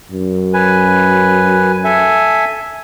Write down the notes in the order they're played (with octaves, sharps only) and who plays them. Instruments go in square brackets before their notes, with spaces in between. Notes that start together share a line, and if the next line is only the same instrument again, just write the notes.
[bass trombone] F#2
[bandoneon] B4 G#5
A4 E5 G#5